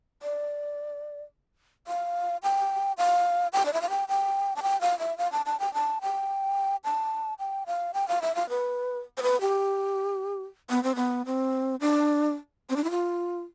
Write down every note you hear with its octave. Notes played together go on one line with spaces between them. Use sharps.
D5
F5
G5
F5
G5
D5
E5
F5
G5
G5
A5
G5
F5
E5
F5
A5
A5
G5
A5
G5
A5
G5
F5
G5
F5
E5
F5
B4
C5
B4
G4
B3
C4
B3
C4
D4
C4
D4
E4
F4